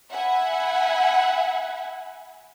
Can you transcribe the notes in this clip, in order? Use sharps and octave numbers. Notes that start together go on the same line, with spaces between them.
E5 F#5 G#5 B5